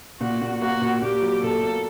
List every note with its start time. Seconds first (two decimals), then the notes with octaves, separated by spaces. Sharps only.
0.20 A#2 F#4
0.41 A#2
0.62 A#3 F#4
0.81 A#2
1.02 A#2 G4
1.22 F#3
1.42 A#2 A4
1.63 A#3